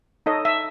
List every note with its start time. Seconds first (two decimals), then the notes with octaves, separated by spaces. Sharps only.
0.26 D#4 A4 C#5 D#5
0.45 E5